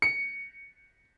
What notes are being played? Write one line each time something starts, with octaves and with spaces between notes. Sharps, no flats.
C#7